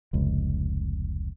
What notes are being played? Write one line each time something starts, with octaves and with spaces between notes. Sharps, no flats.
F1 C#2